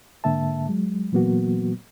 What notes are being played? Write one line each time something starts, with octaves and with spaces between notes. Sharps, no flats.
G#2 D3 A#3 E5 A5
F#3 G#3
A#2 E3 F#3 A#3 B3 F#4